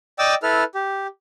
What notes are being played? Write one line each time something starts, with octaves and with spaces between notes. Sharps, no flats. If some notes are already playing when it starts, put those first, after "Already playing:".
D5 D#5 G5 D6 E6
E4 A4 B4 F6
G4